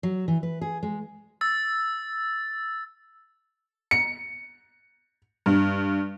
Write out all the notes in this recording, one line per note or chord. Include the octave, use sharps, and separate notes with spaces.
F#3
E3
B4
G#4
G#3
E6 A6
C#7
G2